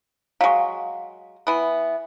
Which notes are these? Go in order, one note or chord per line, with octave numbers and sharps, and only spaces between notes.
F#3 G#3 F5 C#6
E3 B3